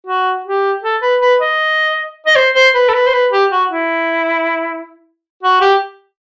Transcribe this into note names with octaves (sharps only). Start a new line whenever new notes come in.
F#4
G4
A4
B4
B4
D#5
D#5
C5
C5
B4
A4
B4
C5
B4
G4
F#4
E4
F#4
G4